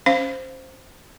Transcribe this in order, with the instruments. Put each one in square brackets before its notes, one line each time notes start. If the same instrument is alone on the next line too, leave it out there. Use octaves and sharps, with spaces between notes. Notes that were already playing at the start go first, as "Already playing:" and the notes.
[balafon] C#4 C5 F5